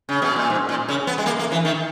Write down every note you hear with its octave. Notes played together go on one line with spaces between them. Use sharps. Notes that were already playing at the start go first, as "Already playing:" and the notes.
C#3
B2
A#2
G#2
A#2
C#3
B3
G#3
A#3
A#3
E3
D#3